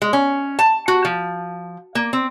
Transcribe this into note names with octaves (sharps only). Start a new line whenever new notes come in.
G#3
C#4
A5
F#4
F3
A#3
C4